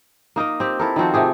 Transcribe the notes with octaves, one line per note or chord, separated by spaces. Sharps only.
A#3 D#4 A#4 D#5
C4 G4
E4 A4 A#4
D#3 F3 C4 F#4
C3 A3 G4 G#4